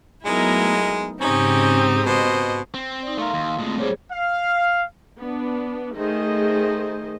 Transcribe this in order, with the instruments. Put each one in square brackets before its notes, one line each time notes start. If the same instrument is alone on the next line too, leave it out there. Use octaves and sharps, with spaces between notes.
[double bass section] F#3 A3 B3 [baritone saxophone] G#3 [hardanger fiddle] D#4 [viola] E4 A#4
[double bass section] G#2 C#3 [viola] C4 G4 [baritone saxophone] C#4 [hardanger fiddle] D#4 D#5
[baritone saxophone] B2 [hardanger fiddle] C5 D#5
[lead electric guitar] C4
[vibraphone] D#4 D5
[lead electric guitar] A3 A#4 [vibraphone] F5 C6
[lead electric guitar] D#2
[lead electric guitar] A#2 G#3 [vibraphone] A3 C4
[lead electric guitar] A#2 G3 [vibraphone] G#4 C5 C#5
[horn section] F5
[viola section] B3 D4
D#3 A3 G#4 C5 D#5